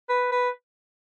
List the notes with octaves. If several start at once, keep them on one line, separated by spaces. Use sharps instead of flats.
B4
B4